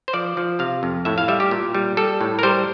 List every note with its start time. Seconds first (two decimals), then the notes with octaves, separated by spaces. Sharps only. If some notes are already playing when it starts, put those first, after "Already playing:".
0.08 C5
0.13 F3 D5
0.37 F3
0.59 C3 F5
0.83 F2
1.05 A2 E5
1.18 F5
1.28 G3 E5
1.40 G4
1.51 A#2
1.74 G3
1.97 G3 A4
2.21 A2
2.39 A#4
2.43 G3 C5